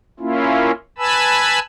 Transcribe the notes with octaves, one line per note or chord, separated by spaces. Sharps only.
A#3 C#4 E4 F4
B4 G#5 A5 B5 E6